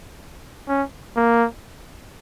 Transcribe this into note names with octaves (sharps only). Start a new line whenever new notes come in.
C#4
A#3